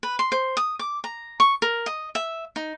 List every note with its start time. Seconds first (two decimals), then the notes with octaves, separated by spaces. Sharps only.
0.03 B4
0.19 C6
0.32 C5
0.57 D#6
0.79 D6
1.04 A#5
1.40 C#6
1.62 A#4
1.86 D#5
2.15 E5
2.56 D#4